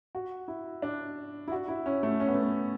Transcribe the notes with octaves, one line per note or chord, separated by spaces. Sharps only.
F#4
E4
D4
E4
F#4
E4
C#4
A3
C#4
B3
A3
B3